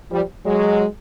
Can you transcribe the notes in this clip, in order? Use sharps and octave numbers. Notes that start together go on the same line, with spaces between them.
F3 G3
F#3 G#3